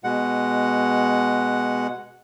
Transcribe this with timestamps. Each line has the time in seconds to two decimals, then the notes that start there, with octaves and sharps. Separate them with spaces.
0.04 B2 G#3 F#5